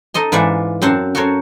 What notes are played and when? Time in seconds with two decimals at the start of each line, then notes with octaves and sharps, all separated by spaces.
0.14 D#4 A4 D#5 C6
0.32 G#2 E3 F4 D5 E5 F#5
0.82 F#2 C4 C5 F#5 A5
1.15 F#4 A4 A#4 C5 C#5